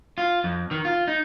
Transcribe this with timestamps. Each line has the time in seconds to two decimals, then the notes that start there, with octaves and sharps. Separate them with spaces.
0.18 F4
0.44 F2
0.71 D#3
0.85 F4
1.08 D#4